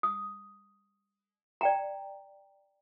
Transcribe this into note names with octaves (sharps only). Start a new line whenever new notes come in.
D#6
D5 G5 A#5